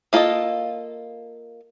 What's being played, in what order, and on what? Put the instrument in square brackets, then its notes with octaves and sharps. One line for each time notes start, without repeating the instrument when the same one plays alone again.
[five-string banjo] A#3 F4 A4 B4 D#5